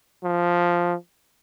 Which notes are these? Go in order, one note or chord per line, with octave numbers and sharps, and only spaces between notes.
F3